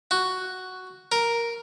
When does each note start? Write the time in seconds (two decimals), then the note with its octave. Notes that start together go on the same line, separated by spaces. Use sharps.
0.11 F#4
1.12 A#4